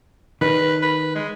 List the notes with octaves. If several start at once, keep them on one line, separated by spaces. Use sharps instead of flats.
D#3 B4
B4
G#3